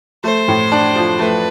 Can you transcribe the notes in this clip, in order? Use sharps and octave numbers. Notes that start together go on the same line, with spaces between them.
A3 C5
A2
D4
F3
A3 B4